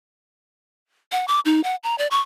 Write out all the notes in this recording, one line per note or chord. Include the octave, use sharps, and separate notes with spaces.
F#5
D6
D#4
F#5
A#5
D5
C#6